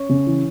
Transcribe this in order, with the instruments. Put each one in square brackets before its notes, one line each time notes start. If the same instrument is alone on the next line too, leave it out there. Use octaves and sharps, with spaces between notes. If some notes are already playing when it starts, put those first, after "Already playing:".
Already playing: [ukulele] C#4
[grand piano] C#3
E3